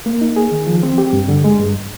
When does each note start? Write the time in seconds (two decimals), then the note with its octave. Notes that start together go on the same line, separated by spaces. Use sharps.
0.06 A#3
0.21 D#4
0.36 G#4
0.52 D#3
0.67 F3
0.83 C4
0.98 G4
1.13 G2
1.28 D3
1.44 G#3
1.59 G2